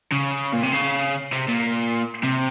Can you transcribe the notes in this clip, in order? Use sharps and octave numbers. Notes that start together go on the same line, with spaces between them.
C#3
A#2
C3
C#3
C3
A#2
C3